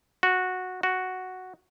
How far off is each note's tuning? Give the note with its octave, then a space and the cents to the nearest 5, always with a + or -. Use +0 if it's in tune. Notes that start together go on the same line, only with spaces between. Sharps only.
F#4 -10
F#4 +0